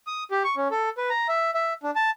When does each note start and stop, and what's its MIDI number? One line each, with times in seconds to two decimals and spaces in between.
0.07 0.24 87
0.31 0.43 67
0.44 0.55 85
0.57 0.68 61
0.71 0.90 69
0.98 1.09 71
1.10 1.27 82
1.29 1.51 76
1.54 1.73 76
1.83 1.91 62
1.96 2.10 81